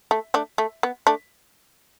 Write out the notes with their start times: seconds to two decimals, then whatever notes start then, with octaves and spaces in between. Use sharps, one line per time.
0.11 A3
0.34 A3 D4
0.58 A3
0.83 B3
1.07 A3 D4